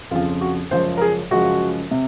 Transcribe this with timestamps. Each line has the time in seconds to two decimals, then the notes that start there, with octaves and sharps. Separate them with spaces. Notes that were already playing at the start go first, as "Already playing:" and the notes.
0.11 F2 C#3 F3 F4
0.41 F#4
0.71 F#2 C#3 F3 G#3 C5
0.97 A#4
1.01 G#4
1.31 F#2 C#3 F3 G#3 F#4
1.91 C3